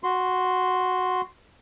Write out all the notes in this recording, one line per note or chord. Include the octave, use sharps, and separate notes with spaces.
F#4 C6